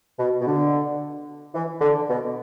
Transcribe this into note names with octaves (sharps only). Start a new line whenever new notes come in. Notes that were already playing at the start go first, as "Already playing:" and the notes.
B2
B2
D3
E3
D3
B2